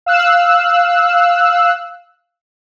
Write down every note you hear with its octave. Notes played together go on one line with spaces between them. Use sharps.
F5 E6 F#6